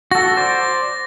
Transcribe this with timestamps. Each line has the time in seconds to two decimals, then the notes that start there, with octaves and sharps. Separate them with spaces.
0.11 F#4 A4 A#6
0.37 C5 D5